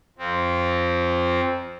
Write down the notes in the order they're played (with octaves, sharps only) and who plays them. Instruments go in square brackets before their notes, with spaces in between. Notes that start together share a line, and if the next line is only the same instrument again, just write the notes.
[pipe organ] F2 F3 C4